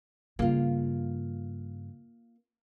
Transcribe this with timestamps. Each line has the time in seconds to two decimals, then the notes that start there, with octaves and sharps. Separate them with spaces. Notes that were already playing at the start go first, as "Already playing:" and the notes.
0.39 G2 C#3 A#3 F4